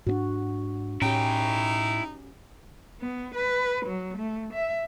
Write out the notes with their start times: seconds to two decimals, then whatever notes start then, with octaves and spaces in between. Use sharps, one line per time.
0.07 G#2 C4 D4 F#4
1.02 A2 C#4 D#4 E4 G4 G5
3.00 B3
3.35 B4
3.86 F#3
4.17 A3
4.53 E5